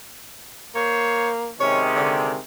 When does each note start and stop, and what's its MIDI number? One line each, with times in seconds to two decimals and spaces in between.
0.74 1.49 58
0.74 1.29 72
0.74 1.29 73
1.60 2.38 48
1.60 2.38 51
1.60 2.38 56
1.60 2.15 61
1.60 1.82 73
1.96 2.33 50